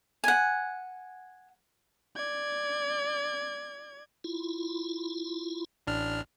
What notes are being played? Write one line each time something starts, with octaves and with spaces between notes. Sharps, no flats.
F#5 G#5
D5 G#6
E4 F4
A1 D4 F6